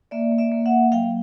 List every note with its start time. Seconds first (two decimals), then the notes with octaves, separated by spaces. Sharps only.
0.11 A#3 D5 E5
0.31 A#3
0.38 D5 E5
0.52 A#3
0.66 E5 F#5
0.72 A#3
0.92 F#3 F5 G5